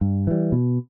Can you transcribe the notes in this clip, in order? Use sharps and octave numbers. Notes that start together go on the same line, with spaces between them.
G2
E3 G3
B2